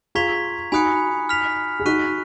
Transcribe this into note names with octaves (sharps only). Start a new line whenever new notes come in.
F4 G#4 A#5 C#6 G#6 B6 F7
D#4 F#4 G#5 B5 D#6 F#6 C#7
F6 B6 F7
G#4
D#4 F#4 C#6 F#6 B6 D#7